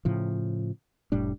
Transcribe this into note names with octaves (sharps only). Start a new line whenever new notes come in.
A2 C#3 F3
F1 A2 G3 D4